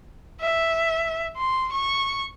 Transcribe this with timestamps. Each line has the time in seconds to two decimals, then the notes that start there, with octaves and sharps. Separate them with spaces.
0.41 E5
1.37 C6
1.72 C#6